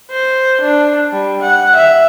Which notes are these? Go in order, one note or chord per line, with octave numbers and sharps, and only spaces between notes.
C5
D4
G3
F#5
E5